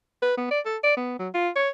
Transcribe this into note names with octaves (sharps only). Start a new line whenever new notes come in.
B4
B3
D5
A4
D5
B3
F#3
F4
C#5